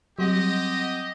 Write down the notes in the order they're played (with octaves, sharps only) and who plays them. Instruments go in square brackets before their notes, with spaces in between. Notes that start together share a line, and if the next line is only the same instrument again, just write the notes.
[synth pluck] F#3 G3 [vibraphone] C4 F#5 [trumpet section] G4 D#5